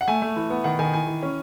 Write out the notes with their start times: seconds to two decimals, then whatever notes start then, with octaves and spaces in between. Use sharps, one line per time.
0.01 F#5
0.08 A3 G#5
0.22 A3
0.36 E3
0.50 B3
0.64 D#3 F#5
0.79 D#3 G#5
0.93 E3 G#5
1.07 E3
1.22 C#4